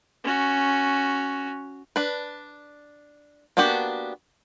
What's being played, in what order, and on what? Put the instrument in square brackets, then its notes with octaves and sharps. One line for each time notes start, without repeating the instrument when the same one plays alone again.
[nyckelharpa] C#4 F#4
[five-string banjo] D4 B4
A#3 B3 D4 F#4 G4